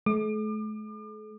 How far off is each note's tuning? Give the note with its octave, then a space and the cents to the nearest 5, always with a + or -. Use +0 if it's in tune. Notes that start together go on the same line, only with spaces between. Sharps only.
A3 -45 D6 +40